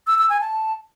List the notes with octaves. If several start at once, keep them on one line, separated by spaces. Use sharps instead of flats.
E6
E6
G#5
A5